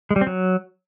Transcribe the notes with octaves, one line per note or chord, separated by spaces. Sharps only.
G#3
G3
C4
F#3